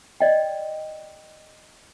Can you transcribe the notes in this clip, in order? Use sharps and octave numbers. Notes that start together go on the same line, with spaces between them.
D5 D#5 G5